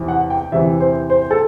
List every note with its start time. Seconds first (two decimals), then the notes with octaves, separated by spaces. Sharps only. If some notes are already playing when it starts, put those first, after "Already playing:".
Already playing: E2 C3 E3
0.08 F#5
0.30 G5
0.52 E2 C3 E3 E5
0.81 C5
1.10 C5
1.31 A4